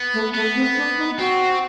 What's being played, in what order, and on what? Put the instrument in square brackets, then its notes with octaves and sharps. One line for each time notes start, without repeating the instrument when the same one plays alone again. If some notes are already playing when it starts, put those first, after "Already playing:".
Already playing: [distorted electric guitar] B3
[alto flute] A3
[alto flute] A3 [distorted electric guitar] B3
[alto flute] C4
D4
D#4
[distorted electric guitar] C4 [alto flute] F#4